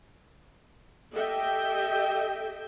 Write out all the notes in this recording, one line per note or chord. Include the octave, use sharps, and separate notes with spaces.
G4 A4 D#5 E5 G5